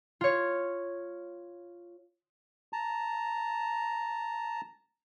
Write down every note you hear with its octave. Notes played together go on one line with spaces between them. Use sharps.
F4 C#5
A5 A#5